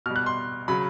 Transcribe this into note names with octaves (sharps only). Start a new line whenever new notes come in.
B2 G3 F6
F#6
C6
C#3 F#3 B5